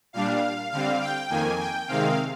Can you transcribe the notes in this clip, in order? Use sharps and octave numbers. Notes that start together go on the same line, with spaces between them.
A#2 G3 D4 F5
D3 G3 C4 F5
G5
F2 D#3 A#3 G#5
G5
C3 D#3 G#3 C4 F5